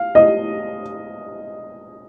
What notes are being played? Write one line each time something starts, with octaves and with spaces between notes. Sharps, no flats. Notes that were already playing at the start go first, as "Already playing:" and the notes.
Already playing: F5
D#5